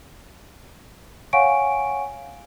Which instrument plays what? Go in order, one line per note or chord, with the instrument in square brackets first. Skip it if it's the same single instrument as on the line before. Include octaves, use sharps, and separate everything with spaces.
[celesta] C#5 F5 F#5 G#5 C#6 D7